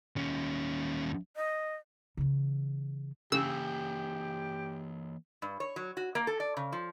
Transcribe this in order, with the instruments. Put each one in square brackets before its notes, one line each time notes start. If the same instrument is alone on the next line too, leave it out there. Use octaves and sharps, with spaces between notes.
[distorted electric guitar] D#2 C#4
[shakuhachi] D#5
[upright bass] C#3 E3
[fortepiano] C#3 [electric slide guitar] E3 A#3 G#5 [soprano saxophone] G4 [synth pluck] E6
[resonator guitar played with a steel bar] G2
C#5
F#3
F#4
A#3
A4
D5
C#3
F3